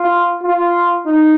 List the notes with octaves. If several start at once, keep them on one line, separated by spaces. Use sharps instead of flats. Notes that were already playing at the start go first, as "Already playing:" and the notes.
Already playing: F4
F4
D#4